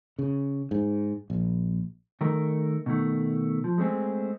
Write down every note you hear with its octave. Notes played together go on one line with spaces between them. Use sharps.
C#3
G#2
A#1
D#3 A3 A#4
B2 D#3 A3
F3
G#3 A3 C4 G#4